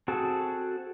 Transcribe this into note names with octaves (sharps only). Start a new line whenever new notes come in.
C4 F#4 G#4 A4 A5